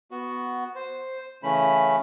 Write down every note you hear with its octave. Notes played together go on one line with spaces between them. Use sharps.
B3 F#4
C5
C#3 E3 A3 C#4 B5